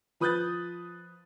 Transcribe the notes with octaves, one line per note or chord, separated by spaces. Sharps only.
F3 B4 D#6 F#6 G6 A6